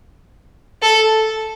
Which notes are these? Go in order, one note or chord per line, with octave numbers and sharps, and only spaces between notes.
A4